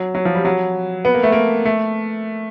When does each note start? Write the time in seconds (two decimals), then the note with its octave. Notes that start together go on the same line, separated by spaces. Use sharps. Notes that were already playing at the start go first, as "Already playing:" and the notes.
Already playing: F#3
0.15 F#3
0.25 F3
0.35 G3
0.45 F#3
1.05 B3
1.14 A#3
1.23 A3
1.32 A#3
1.65 A3